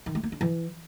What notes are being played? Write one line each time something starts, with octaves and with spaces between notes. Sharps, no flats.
D#3
A3
A#3
D4
E3